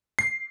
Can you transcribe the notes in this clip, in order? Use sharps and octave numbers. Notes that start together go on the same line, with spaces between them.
C7